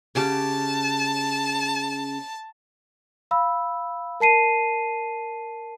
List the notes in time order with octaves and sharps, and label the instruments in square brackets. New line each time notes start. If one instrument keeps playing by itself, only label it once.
[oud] C#3 G4 [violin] A5
[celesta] F5 B5 E6
A#4 A5 C7 D#7